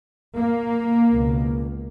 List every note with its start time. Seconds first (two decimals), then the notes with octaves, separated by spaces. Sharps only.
0.38 A#3
1.11 C#2 B2